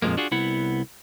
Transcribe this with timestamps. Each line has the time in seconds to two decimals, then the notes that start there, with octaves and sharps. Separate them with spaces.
0.02 F2 A#2 F3 G#3 A#3
0.17 D4 F4 F#4 G#4
0.31 C2 B3 E4 F#5